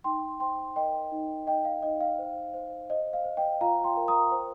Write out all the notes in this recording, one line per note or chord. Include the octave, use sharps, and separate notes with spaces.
D#4 G5 C6
C5 G5 C6
A#4 D#5 G5
D#4
D#4 D#5 G5
F5
D#4 D#5
F5
C5
C5
C5 D#5
F5
C5
D#5 G5
F4 F5 A#5
G5 C6
A#4
A#5 D#6
C5